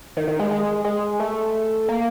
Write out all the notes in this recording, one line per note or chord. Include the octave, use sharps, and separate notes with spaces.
D#3
D#3
G#3
G#3
G#3
A3
A#3